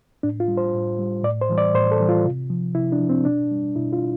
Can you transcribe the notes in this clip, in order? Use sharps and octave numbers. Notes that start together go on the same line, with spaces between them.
A2 D4
F4
G3
C5
A2
G3
A2 D5
C5
E3 G3
D5
A2 C5
A4
E3 G3
F4
C3
F3
C3 E4
D4
F3
C4
B2 D4
G3
B2 E4
F4